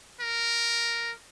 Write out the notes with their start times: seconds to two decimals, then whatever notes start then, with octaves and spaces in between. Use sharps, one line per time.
0.21 A#4